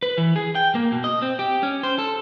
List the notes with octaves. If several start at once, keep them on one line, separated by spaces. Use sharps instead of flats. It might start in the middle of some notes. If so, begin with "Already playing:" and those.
B4
E3
G#4
G5
A#3
B2
D#5
C4
G4
C#4
C5
A4